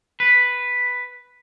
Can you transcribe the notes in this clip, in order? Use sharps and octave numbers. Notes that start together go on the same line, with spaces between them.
B4